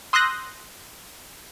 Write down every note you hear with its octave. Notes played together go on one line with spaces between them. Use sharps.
C6 D#6 E6 F#6 G6 A#6